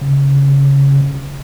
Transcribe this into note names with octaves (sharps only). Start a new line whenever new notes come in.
C#3